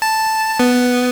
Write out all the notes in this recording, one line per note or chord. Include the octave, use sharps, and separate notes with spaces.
A5
B3